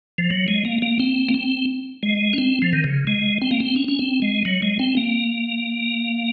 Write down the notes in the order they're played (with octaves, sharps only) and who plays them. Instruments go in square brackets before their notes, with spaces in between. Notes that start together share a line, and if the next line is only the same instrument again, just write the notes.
[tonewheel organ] F3
F#3
G#3
A#3
A#3
C4
A#3
C4
G#3
C#4
C4
F3
D#3
C#3
G#3
C4
A#3
C4
C#4
C#4
C4
G#3
F#3
G#3
C4
A#3